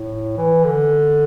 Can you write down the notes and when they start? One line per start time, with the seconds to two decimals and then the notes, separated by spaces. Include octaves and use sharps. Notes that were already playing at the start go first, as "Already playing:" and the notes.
Already playing: A2
0.38 E3
0.64 D3